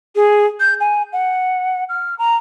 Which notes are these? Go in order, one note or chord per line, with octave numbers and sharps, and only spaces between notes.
G#4
G6
G#5
F#5
F6
A#5